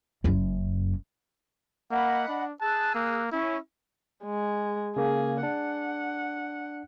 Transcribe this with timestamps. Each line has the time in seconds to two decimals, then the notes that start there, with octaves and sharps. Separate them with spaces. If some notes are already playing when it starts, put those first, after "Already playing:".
0.24 F#1 F#2
1.91 A#3 D#5 F#5 B5
2.28 D4
2.60 G#4 A5 E6 F#6
2.95 A#3
3.32 C#4 E4
4.24 G#3
4.96 C#3 A#3 G#4
5.43 D4 F#5